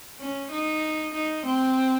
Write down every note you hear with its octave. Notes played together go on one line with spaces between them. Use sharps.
C#4
D#4
D#4
C4